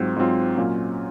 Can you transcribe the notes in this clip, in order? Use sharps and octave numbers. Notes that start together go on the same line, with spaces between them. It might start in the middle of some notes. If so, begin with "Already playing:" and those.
Already playing: G#2 F#3 C4 F4
G#2 F#3 C4 F4
A#2 F#3 C#4 F4